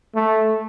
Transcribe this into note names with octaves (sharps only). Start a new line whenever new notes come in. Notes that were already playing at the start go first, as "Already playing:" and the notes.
A3